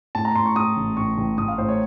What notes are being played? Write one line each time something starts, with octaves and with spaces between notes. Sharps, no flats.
A2 A5
A#5
A2 C6
C#6
A2 D#6
A1
A1 C#6
A1
A1 D#6
F5
A2 C5
C#5